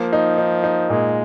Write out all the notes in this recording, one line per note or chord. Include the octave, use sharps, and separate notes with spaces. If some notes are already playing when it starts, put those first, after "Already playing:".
Already playing: F3 A#3
D#4
D#4
D#4
A#2 G#3